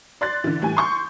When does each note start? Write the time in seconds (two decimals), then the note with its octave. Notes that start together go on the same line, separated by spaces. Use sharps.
0.21 D5 C6 F#6 A6
0.44 D3 E3
0.61 A2 E3 G3 G#5
0.77 C6 C#6 G6